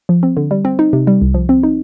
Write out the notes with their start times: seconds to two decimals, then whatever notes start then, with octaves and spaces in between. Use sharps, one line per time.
0.09 F3
0.23 C4
0.37 D3
0.51 G3
0.65 C4
0.79 D#4
0.93 C3
1.07 G3
1.22 C2
1.34 F3
1.49 C4
1.63 D#4